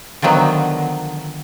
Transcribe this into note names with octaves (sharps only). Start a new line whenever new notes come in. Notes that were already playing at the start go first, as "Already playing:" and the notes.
D3 D#3 F3 F#3 B3